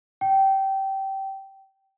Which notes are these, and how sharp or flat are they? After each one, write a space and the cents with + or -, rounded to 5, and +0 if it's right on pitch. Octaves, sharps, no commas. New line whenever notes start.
G5 -20